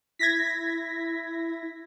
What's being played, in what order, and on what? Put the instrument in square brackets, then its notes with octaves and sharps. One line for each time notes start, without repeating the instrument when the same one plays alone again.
[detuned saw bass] E4 [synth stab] G#6 A#6 B6